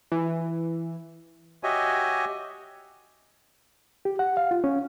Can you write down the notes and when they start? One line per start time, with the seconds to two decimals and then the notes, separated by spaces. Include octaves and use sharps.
0.12 E3
1.63 F#4 G4 C#5 D#5 E5 G#5
4.05 G4
4.19 F#5
4.37 F5
4.51 F4
4.64 C#4